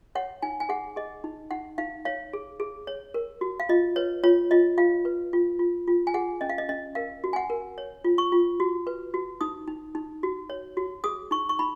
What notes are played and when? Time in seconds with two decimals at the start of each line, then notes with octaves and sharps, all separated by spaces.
0.15 C#5 F#5
0.42 D#4 G#5
0.60 G#5
0.69 G#4 F#5
0.96 G#4 D#5
1.24 D#4
1.51 D#4 F#5
1.78 D#4 F5
2.05 C#5 F5
2.33 G#4
2.60 G#4
2.87 C#5
3.14 A#4
3.41 F#4
3.60 F5
3.69 F4 D#5
3.96 B4 C#5
4.24 F4 C#5
4.51 F4 D#5
4.78 F4 F5
5.05 B4
5.33 F4
5.59 F4
5.87 F4
6.07 G#5
6.14 G#4 F#5
6.41 C#4 D#5
6.49 F5
6.58 D#5
6.69 C#4 D#5
6.95 A#4 F5
7.24 F#4
7.33 G#5
7.36 F#5
7.50 A#4
7.78 C#5
8.04 F4
8.18 C#6
8.32 F4
8.60 F#4
8.87 B4
9.14 F#4
9.41 D#4 D#6
9.68 D#4
9.95 D#4
10.23 F#4
10.50 C#5
10.77 F#4
11.04 G#4 D#6
11.31 D#4 C#6
11.49 C#6
11.59 D#4 B5